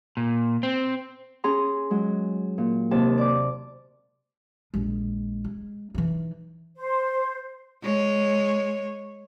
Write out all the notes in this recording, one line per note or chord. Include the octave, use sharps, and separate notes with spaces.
A#2
C4
C#4 G#4 A#5 C6
F#3 G#3
A#2
D#2 C3 A5
D5 D6
A#1 G#3
G#3
E3 D#4
C5
G#3 C#5